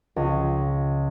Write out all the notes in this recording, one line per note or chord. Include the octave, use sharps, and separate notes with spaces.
C#2